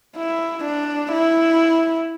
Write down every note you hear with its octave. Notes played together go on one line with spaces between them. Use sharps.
E4
D4
E4